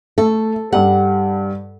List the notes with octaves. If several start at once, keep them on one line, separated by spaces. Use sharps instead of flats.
A3 A4
G2 G3 F#5